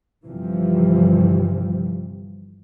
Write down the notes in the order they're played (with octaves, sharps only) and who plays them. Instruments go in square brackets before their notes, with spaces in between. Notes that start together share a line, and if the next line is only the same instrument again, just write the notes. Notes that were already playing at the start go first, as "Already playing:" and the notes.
[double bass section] G1 C3 E3 F3 G3